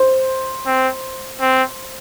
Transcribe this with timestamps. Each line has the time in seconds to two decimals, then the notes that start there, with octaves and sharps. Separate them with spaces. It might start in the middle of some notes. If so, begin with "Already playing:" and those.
Already playing: C5
0.66 C4
1.41 C4